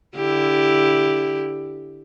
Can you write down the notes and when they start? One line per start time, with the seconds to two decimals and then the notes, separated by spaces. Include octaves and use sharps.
0.16 D3 E4 G4